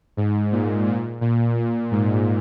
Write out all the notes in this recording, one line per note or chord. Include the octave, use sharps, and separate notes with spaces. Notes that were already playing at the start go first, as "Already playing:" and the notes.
G#2
A#2
A#2
A#2
A#2
G#2